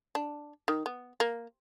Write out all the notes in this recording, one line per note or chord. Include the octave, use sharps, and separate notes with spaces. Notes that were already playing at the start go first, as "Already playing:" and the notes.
D4
D#3
B3
A#3